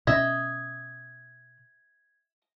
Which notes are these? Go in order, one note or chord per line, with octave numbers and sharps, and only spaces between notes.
B2 C#4 D#5 E5 G#6